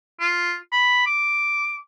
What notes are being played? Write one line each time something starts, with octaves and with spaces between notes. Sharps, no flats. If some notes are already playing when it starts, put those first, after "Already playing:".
F4
B5
D6